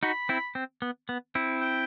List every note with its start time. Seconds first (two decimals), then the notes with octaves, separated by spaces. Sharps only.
0.03 D#4 F#4 B5
0.29 C4 E4
0.55 C4
0.82 B3
1.09 B3
1.35 C4 E4
1.61 G5